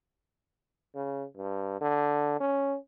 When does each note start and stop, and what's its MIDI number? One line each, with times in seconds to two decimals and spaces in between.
0.95 1.24 49
1.36 1.79 43
1.81 2.40 50
2.40 2.77 61